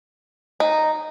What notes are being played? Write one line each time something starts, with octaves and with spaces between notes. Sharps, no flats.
D#4